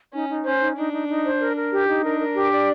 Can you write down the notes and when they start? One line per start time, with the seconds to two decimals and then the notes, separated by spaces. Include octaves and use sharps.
0.13 C#4 D#4
0.28 D#4
0.45 C#4 C5
0.60 D#4
0.77 D4 D#4
0.93 D#4
1.08 D#4
1.24 C5
1.40 A#4
1.56 A#4
1.72 G4
1.88 D#4
2.03 D4 A#4
2.19 A#4
2.35 G4
2.51 D5